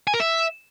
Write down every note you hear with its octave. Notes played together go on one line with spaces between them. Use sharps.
G#5
A#4
E5